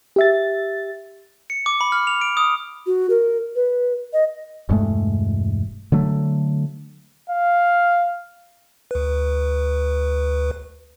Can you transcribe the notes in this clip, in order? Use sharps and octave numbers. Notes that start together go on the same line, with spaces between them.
G4 E5 A6
C#7
D6
B5
F6
F7
D7
D#6
F#4
A#4
B4
D#5
E1 G2 G#3 A3
D3 F#3 A3
F5
D2 B4